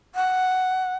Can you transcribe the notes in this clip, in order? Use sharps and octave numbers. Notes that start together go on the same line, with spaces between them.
F#5